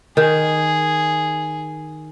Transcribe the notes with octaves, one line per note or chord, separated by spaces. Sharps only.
D#3 G#4